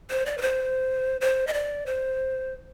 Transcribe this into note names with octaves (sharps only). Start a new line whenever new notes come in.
C5
D5
B4
C5
C5
D#5
D5
C5